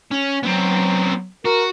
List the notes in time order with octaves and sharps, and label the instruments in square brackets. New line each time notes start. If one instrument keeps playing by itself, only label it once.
[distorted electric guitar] C#4
[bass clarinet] F#3 [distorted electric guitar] B3 C4
[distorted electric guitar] F#4 [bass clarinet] A#4